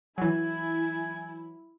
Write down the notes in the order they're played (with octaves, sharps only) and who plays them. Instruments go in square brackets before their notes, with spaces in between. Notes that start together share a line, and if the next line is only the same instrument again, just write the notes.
[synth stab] E3 F#3 [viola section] E4 [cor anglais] G#5